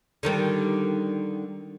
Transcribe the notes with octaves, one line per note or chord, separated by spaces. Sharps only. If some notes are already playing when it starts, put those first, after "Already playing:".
D3 D#3 G3